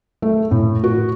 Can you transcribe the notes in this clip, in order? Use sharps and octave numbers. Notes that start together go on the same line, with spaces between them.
A3
A2
F#4